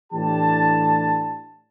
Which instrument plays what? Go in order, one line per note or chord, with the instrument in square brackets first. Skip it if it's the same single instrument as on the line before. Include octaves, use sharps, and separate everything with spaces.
[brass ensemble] A2 E3 D4 G4 A5